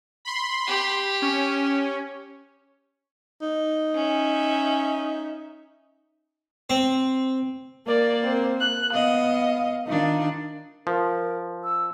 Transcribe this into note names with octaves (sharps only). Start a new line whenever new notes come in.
B5 C6
G4
C#4
D#4
C#4 E5
C4
A#3 A#4 D5
C4 A#4
F#6
B3 D#5 F5
D#3 D4 D#4 F4
F3 A#4
E6